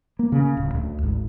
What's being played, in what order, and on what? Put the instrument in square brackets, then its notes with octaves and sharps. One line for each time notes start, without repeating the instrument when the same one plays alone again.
[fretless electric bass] A#3
C#3
D1
D2
G#1